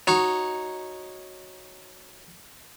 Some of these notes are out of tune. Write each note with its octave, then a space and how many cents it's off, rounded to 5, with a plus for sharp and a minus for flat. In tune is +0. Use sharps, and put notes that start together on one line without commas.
D#4 +0 F#4 +0 C#5 -10